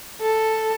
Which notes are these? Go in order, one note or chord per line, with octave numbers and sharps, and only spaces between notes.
A4